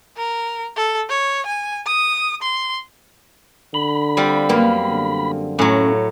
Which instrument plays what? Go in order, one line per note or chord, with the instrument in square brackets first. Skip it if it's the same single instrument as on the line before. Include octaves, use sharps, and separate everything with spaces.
[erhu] A#4
A4
C#5
G#5
D#6
C6
[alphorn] D3 [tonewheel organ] B5
[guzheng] G3 C4 F4
[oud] F#2 A#3 B3
[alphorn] D3
[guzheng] A2 F#3 [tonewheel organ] C#4